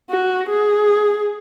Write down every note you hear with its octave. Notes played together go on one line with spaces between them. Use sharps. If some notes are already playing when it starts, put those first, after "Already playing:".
F#4
G#4